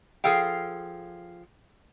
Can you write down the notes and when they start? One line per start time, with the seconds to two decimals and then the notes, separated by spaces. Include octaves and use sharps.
0.24 F3 G#4 A4 F5 G5